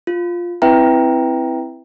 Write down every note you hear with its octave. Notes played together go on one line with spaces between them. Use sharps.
F4
C4 E4 B4 E5 G5 A#5